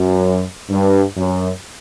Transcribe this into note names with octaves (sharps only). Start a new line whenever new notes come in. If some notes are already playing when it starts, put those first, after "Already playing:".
Already playing: F#2
G2
F#2